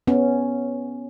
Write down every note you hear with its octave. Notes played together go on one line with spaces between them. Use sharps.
B3 C#4